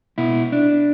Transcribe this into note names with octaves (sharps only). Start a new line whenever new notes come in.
B2 E4
D4